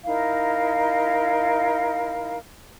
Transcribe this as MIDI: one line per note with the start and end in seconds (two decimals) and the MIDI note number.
0.05 2.37 63
0.05 2.37 64
0.05 2.37 70
0.05 2.37 77